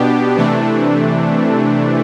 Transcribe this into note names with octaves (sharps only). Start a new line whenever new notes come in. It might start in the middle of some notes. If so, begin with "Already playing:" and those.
Already playing: B2 B3 D4 G4
C3 E3 A3 D4